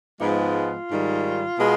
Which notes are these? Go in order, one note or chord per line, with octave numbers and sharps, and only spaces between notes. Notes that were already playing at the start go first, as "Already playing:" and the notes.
G#2 F3 G#3 B3 F4
G#2 D#3 G3
B2 G#3 B3